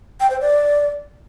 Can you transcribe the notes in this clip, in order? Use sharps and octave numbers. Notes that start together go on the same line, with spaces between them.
G5
C5
D5